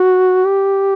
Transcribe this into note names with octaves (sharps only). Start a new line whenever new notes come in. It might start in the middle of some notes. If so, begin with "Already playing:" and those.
Already playing: F#4
G4